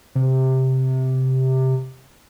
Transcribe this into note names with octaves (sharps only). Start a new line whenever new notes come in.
C3